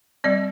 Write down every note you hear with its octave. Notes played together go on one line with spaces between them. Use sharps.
G3 C4 D5